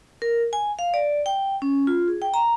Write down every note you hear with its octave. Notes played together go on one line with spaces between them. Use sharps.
A#4
G#5
F5
D5
G5
C#4
F4
G#4
G5
A#5